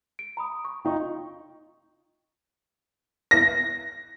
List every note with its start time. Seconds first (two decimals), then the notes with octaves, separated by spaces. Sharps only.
0.19 D7
0.37 A#5 B5 D#6
0.65 C#6
0.85 D#4 F4 G5 C#6
3.31 A#6